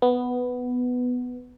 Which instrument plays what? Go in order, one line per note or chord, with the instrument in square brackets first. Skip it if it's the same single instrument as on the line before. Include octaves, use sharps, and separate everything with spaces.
[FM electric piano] B3